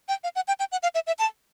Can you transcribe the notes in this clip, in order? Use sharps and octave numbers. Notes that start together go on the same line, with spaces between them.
G5
F5
F#5
G5
G5
F#5
F5
E5
E5
A5